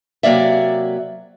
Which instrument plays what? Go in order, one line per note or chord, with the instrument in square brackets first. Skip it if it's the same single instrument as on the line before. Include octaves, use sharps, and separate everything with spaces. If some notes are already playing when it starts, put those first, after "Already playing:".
[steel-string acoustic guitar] C3 F#3 A#3 D5 E5